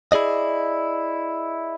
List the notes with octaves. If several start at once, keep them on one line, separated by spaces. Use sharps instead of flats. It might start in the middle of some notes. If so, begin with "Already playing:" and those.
E4 G#4 D5 D#5